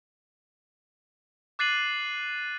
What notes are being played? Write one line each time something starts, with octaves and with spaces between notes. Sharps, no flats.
D6 F#6 A6 C7 D#7 F#7